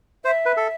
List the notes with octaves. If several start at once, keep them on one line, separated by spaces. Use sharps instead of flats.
C5 E5
B4
A4